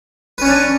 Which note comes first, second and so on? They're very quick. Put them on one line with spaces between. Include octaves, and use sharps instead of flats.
B4 C#4 C#5 D4